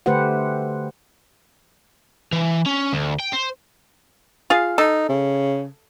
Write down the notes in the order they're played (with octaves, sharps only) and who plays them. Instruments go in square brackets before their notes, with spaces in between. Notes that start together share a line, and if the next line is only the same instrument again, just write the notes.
[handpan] D3 A3 G4 B4 C5 F#5
[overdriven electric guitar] E3
C#4
D2
G5
C5
[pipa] F4 G#4 F5
[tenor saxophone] D#4 [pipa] A4
[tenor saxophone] C#3